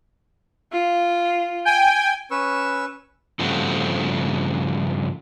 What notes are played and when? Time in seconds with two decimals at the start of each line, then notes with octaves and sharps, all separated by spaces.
0.72 F4
1.65 G5 G#5
2.31 C#4 B4 C#6 E6
3.39 G2 C#3 F3 A3 C4 F#4